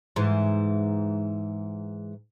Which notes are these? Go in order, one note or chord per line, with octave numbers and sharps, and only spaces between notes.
G#2 E3